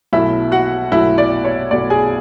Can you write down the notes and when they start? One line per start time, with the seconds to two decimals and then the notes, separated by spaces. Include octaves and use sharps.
0.13 B1 B2 F#3 A3 E4 E5
0.52 F#4 F#5
0.92 B1 B2 F#3 A3 E4 E5
1.18 D5
1.45 C#5
1.71 B1 B2 F#3 A3 D5
1.90 G#4 G#5